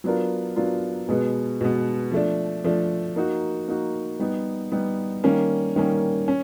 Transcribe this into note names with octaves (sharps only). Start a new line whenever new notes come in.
F#3 B3 D4 F4 A#4
F#3 B3 D4 F4 A#4
B2 G#3 B3
B2 G#3 B3
F3 A3 D4
F3 A3 D4
A#3 D#4 F#4
A#3 D#4 F#4
G3 B3 D#4
G3 B3 D#4
D#3 G3 A#3 C#4
D#3 G3 A#3 C#4
C#4